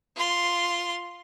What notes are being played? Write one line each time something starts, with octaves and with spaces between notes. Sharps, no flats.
F4 C6